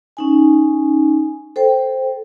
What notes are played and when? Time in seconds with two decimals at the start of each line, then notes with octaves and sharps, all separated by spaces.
0.17 C#4 D#4 G#5
1.56 A4 C5 G5